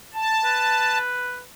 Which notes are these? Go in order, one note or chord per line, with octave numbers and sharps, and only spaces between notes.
A5
B4